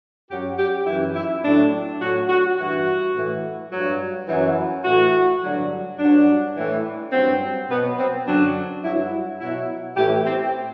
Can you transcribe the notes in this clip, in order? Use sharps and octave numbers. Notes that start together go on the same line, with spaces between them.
F#2 F#3 G4
G4
F#2 E3 E4
E4
A2 F#3 D4
A2 F#3 F#4
F#4
G2 E3 F#4
A2 E3
G2 F#3
F#2 E3
A2 E3 F#4
G2 D3 F#3
G2 F#3 D4
A2 E3
G2 F#3 C4
B2 F#3 B3
C4
F#2 D3 F#3 D4
G2 F#3 E4
B2 F#3 E4
A2 E3 G4
C4